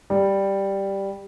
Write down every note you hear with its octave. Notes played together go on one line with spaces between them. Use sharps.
G3